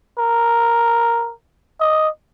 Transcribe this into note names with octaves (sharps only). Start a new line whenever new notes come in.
A#4
D#5